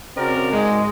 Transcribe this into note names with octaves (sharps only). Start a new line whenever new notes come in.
C#3 C4 F#4 A#4 D5
G#2 G#3